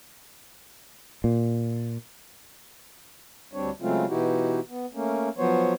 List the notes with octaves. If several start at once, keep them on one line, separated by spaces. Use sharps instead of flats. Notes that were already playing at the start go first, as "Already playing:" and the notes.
A#2
D2 G3 C4 D4 C#5
C#3 F#3 G#3 A3 C4 F4
B2 E3 D#4 E4 F#4 G4
B3
A3 A#3 C#4
F3 F#3 B3 C5 C#5